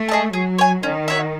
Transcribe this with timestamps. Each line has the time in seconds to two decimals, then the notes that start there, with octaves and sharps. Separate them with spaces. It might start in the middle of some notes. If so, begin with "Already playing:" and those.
Already playing: A3
0.09 G#4 D#5 A5
0.33 F#3 G#4
0.58 C#5 G#5
0.83 D#3 C#4
1.08 F#4 C#5 E5